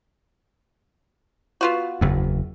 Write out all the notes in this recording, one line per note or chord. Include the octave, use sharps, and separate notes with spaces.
B3 F4 F#4
F#1 E2